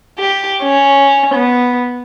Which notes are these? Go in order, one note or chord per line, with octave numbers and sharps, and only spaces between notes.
G4
C#4
B3